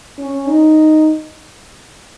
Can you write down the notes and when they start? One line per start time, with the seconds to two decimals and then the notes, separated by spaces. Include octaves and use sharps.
0.18 C#4
0.47 D#4